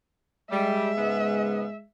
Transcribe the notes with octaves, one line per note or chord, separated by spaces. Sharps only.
G3 G#3 E5
G#2 C#3 B3